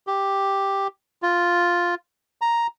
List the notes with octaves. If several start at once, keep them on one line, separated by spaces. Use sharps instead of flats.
G4
F4
A#5